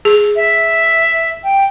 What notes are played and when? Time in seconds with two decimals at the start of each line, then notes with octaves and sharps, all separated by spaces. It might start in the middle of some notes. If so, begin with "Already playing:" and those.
0.05 G#4
0.36 E5
1.44 G5